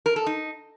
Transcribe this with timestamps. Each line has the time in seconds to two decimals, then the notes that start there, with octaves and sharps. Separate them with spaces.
0.06 A#4
0.16 A4
0.26 D#4